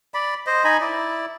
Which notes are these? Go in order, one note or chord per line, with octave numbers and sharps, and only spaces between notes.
D5 B5
C5 D#5
D#4 D#5 G#5 B5
E4 D5